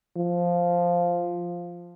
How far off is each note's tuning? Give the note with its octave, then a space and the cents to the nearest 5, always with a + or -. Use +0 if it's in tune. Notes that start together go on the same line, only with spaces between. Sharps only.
F3 +0